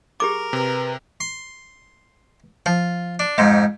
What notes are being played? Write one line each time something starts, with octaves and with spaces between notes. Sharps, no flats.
G4 G#4 A#4 D6
C3 B4
C6
F3 F4
D4
F2 G#2 G#3